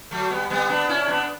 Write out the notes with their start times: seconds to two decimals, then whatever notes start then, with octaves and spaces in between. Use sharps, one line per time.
0.11 F#3 A3
0.30 G3 B3
0.50 G3 B3
0.69 B3 D4
0.89 C#4 E4
1.08 B3 D4